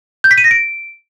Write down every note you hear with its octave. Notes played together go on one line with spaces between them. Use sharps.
G6
B6
D#7
A#6
D7